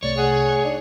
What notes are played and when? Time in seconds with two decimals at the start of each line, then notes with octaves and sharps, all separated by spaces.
0.03 C2 C3 A3 C#5 D5
0.17 G#4 F#5
0.65 D4 D#4